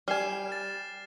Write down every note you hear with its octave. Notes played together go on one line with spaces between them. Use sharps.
G3 G#5 F6 C7 E7
A6